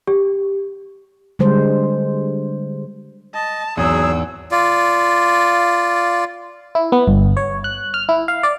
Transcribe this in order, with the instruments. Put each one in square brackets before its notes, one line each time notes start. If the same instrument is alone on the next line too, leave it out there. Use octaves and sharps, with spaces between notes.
[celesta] G4
[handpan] D3 G3 G#3 C5
[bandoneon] D#5 [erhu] A5
[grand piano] G#1 E2 [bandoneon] F#3 G#4 [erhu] E6
[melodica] F4 D5
[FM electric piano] E4
B3
G1
C#5
F#6
F6
E4
F5
D5